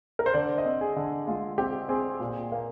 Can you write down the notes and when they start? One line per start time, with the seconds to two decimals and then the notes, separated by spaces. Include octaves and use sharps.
0.19 A#4
0.26 C5
0.34 D3 D5
0.58 D#5
0.65 C4
0.81 G#4
0.96 D3
1.27 G#3 F4
1.58 C4 G4
1.89 C4 G#4
2.20 A#2
2.52 A#3